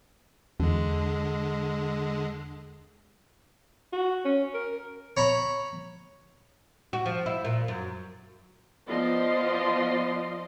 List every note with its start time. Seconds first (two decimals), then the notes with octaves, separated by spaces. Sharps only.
0.60 E2 D3 G#3
3.93 F#4
4.25 C#4
4.54 A#4
5.17 C#5 A#5 B5
6.93 F#4
7.06 F3
7.26 E4
7.45 A#2
7.68 F#2
8.88 F3 B3 F4 D5 D#5 C6